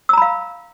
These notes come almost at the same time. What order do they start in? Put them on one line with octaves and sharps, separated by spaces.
E6 A#5 B5 F5